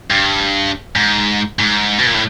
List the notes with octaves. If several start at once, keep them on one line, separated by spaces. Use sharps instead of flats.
G2
G#2
G#2
B2
A#2
A2